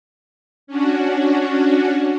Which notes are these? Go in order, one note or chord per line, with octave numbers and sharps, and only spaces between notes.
C#4 D4 F#4